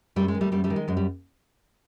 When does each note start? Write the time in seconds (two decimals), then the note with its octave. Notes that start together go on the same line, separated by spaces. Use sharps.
0.16 F#2 G3 A3
0.28 G#3
0.35 D#3
0.41 G3 A3
0.52 F#2 G3 A3
0.64 G3 A3
0.70 D#3
0.76 G#3
0.88 F#2 G#3
0.97 G3